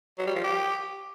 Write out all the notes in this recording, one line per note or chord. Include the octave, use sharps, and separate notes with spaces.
F#3
G3
F3
G4